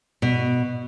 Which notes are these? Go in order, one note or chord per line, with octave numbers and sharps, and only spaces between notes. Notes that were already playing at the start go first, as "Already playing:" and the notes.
B2